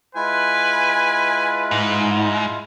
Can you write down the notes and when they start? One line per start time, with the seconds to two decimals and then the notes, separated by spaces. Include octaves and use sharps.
0.15 G#3 E4 F4 B4 G#5
1.71 G#2